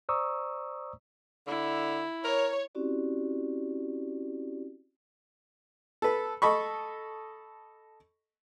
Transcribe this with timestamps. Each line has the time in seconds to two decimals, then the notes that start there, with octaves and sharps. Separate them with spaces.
0.09 C5 D5 A#5 C#6 D#6 E6
1.47 D3 E4
2.24 A#4 C#5
2.75 C4 C#4 E4 F#4 G4 D5
6.02 A4 B4
6.42 A4 D#5 B5 C#6